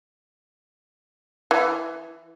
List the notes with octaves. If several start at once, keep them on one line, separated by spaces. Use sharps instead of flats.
E3